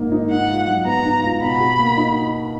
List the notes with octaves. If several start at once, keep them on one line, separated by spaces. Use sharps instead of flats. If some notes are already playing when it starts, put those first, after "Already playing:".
Already playing: G#2 D#3 A#3 D#4
D#4
G#2 F#5
F4
F#3
B3 A#5
G#2
F4
B2 B5
F#4
A#3
D#4